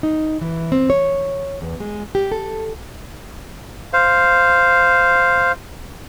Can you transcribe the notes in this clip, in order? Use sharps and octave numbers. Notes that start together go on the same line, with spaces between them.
D#4
E3
C4
C#5
E2
G#3
G4
A4
C5 F5